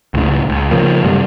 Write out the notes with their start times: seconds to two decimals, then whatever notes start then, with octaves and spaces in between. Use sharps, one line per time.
0.14 C#2 A2 C#3
0.49 C#2
0.71 C#3 F3 A#3
1.04 F#2 C3 G3 A3